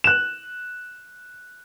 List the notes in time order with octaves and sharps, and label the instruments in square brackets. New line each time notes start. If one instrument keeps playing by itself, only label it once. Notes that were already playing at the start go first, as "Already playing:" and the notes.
[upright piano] F#6 E7